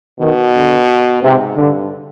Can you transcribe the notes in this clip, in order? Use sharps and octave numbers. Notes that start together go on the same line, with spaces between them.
B2 D#3
D3
G#2 C3
G2 D3